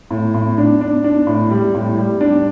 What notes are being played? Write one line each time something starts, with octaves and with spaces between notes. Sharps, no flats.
A2
A2
D4
D4
D4
A2
G3
A2
G3
D4